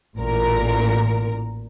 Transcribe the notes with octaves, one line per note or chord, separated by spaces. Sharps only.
A1 A#2 A#4